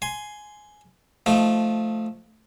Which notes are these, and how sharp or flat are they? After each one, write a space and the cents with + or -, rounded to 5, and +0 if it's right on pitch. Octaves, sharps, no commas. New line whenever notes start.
G#5 +10 C6 +0
F3 +0 A3 +0 D#4 +20